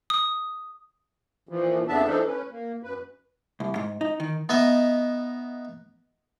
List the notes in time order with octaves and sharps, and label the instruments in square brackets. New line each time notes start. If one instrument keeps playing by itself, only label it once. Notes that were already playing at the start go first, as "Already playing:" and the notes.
[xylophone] D#6
[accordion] A#2 E3 F3
F2 C#3 B3 D4 E5 A5
E3 F3 D4 D#4 A4
C#4 B4
A#3
F#2 B4
[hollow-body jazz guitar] C2
G#2
D#4
D#3
[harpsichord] B3 D#4 D#5 E5